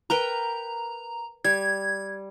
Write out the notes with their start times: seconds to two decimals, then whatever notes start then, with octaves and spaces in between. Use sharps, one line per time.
0.10 A#4 B4 G5 A#5
1.44 G3 G#6